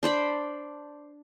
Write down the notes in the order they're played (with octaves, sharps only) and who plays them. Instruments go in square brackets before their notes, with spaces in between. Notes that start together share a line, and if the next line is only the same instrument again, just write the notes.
[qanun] D4 C5 D5 B5